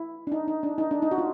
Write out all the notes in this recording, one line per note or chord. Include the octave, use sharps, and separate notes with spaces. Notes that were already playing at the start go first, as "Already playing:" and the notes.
Already playing: E4
D4
D#4
D#4
D4
D#4
D4
D#4
F#4
F4